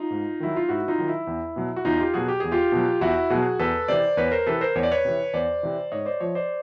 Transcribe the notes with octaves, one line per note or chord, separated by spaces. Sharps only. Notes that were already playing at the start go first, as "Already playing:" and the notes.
Already playing: D#4 F4
G#2
D#3 F#3 E4
F4
G#2 E4 F#4
D#4 F4
D#3 F#3
E4
E2
B2 F#3
F#4
E2 D#4 F4
F4 G4
B2 F#3 F#4 G#4
G4
E2 G#4
F4 G4
B2 F#3
E2 E4 F#4
B2 F#3 F#4 G#4
E2 A4 B4
C3 E3 C5 D5
E2 B4 C#5
A#4 C5
C3 E3 A4 B4
A#4 C5
E2 C#5
D5
B4 C#5
C3 E3
E2 C5 D5
C3 E3
G#2 C#5 D#5
C5 D5
F3 C#5 D#5
C5 D5